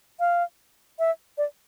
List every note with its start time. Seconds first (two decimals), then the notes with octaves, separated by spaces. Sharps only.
0.20 F5
0.99 E5
1.38 D5